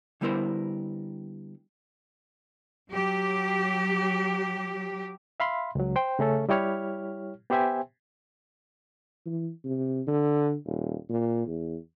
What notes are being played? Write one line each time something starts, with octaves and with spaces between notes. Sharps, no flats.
D3 G3 B3 E4 A#4 C5
F#3 G4
E5 F5 B5 C6
C#2 F#3
C5 G5
C#3 A3 C#4 A4
G3 E4 G4 C#5 F6
B3 G4 C5 E5 G5 G#5
E3
C3
D3
D#1
A#2
E2